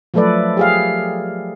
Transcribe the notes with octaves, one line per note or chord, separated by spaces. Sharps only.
F3 F#3 A3 A4 B4 D5
G4 G#4 F5